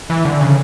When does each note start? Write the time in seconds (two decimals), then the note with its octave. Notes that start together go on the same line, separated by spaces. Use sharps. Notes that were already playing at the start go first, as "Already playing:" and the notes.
0.10 E3
0.25 D3
0.41 C#3